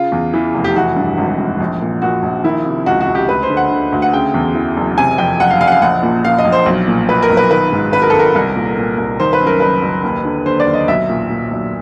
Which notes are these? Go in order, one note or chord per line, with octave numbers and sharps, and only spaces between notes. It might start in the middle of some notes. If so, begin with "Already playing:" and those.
Already playing: C#3 F4
E2
E3
F1
G4
E3 F#4
G2
G#1
G#1
A#1
A#2
A#2 F#4
A#1
D#3 E4
C3
C#2 F#4
F#4
C#2
G4
D2 B4
C5
D3
F#5
D3
D2
F#5
C#3 G5
E2
E3
F#1
C3 G#5
F2 G5
F#1 F#5
F5
F#1 F5
F#5
F5
A#1 F#5
A#2
A#2 F5
D#5
A#1
C5
B1
A#2
A#2 B4
A#4
B1
B4
D#3 B4
G#2
G#1 B4
A#4
G#1 A4
A#4
C2
A#2
A#2
C2
D#3 C5
B4
F#2
A#4
F#1 B4
F#1
D#2
D3
D3 C5
D5
D#2
D#5
B1 E5
A#2
A#2
B1